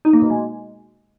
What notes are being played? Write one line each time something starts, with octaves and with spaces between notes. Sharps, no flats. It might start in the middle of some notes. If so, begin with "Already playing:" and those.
D#4
A#3
B2
G#3